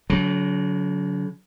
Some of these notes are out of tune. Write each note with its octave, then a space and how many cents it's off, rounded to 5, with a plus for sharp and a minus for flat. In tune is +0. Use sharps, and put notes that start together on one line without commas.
D3 -45 F#3 +0